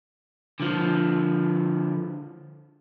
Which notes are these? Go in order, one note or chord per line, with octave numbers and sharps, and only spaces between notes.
D3 F3